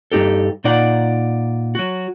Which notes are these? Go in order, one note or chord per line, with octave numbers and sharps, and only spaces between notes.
G2 D#4 G4 A4
A#2 D#4 D5 F#5
F#3 F#4